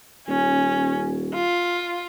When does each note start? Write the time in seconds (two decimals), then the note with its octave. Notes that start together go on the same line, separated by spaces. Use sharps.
0.28 D#1 C#4
1.34 F4